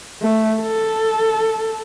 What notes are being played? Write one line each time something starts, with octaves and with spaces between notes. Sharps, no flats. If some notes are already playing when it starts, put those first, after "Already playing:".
A3
A4